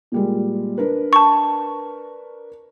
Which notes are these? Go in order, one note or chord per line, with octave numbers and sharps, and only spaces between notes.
A#2 G3 G#3
D4 A#4 B4
A5 C#6